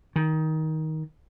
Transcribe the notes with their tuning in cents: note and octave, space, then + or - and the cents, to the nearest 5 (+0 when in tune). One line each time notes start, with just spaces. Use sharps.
D#3 +15